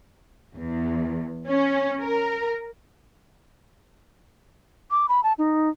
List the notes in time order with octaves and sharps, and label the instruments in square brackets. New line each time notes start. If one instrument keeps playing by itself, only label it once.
[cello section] E2
C#4
A#4
[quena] D6
B5
A5
D#4